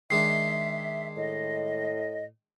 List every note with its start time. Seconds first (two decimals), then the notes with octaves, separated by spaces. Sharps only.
0.10 D#3 G#3 D4 E5 C7
1.17 A2 D#5